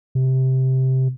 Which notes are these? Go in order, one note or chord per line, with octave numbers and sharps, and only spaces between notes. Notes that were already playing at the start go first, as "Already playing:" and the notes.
C3